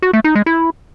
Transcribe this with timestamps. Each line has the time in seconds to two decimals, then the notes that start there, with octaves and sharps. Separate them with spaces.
0.02 F#4
0.13 A3
0.24 D#4
0.35 G#3
0.46 E4